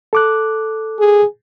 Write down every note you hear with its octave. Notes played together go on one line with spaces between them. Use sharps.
A4 D6 F#6
G#4